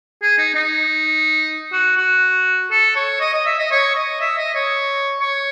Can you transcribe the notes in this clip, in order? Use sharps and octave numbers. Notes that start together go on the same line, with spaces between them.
G#4
D#4
D#4
F#4
F#4
A4
C#5
D#5
D#5
E5
D#5
C#5
D#5
E5
D#5
C#5
C#5